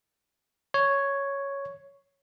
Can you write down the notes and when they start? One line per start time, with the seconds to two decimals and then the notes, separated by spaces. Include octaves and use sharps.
0.74 C#5